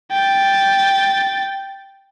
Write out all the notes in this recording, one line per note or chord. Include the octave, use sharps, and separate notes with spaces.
G5 A6